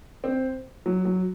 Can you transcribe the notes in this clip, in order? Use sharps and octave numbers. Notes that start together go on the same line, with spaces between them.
C4
F#3
F#3